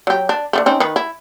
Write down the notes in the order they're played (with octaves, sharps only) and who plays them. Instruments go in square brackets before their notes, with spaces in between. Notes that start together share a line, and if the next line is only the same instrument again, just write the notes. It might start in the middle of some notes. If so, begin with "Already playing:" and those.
[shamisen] F#3 G4
D4
D3 D#3 A3
C4 C#4 D#4
D#3 B4
E4